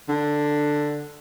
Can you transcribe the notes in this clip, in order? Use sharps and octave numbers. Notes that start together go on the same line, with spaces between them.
D3